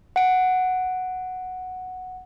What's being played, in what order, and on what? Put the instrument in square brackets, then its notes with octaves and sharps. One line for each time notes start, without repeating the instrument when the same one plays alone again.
[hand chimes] F#5 D7